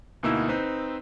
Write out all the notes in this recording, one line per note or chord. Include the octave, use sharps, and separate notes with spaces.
D2 B2 A#3 D#4 E4 E6
C4 D#4 B4 C5